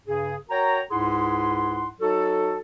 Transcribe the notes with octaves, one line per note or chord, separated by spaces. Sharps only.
G2 C#3 G#4
F#4 A#4 C#5 G5 A#5
C#2 G#2 E4 G#4 F#5 C6
F#3 D#4 F#4 A4